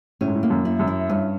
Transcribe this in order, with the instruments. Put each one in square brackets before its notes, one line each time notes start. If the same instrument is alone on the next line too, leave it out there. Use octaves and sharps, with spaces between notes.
[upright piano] A2 [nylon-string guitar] C#4
[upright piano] G#2
A2
[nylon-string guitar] A#3
[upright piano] F#2
[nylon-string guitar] E4
[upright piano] F#2
[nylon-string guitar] E4
[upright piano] G2 [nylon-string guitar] C#4